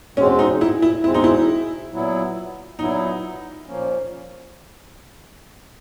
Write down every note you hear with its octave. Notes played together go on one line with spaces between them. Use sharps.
E2 B2 G#3 C4 C#4
D#4
E4
E4
E2 B2 G#3 C4 E4
D#4
E4
A#2 F#3 B3 E4
A#2 F#3 B3 D#4 E4
A#2 F3 A#3 C#4